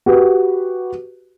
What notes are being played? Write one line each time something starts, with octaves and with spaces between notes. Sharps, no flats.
F#4 G4 B4